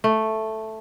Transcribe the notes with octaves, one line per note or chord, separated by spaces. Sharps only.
A3